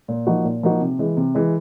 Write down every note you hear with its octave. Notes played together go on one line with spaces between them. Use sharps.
A#2
F3 A#3 D#4 F#4
A#2
F3 A#3 D#4 F#4
C3
E3 G#3
C3
E3 G#3